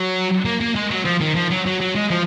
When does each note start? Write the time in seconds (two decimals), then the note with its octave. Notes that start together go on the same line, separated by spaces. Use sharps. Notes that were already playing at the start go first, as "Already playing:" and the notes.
Already playing: F#3
0.45 A#3
0.61 A#3
0.75 G#3
0.91 F#3
1.05 F3
1.21 D#3
1.36 F3
1.50 F#3
1.66 F#3
1.81 F#3
1.95 G#3
2.11 F3